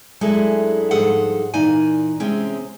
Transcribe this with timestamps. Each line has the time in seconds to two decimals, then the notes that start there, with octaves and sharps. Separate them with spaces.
0.21 F#2 G#3 D4 E4 A4
0.91 G#2 F3 G3 G#4 A4 F#5
1.54 A#2 E3 A#3 D#4 D5 G#5
2.20 C3 G#3 C4 C#4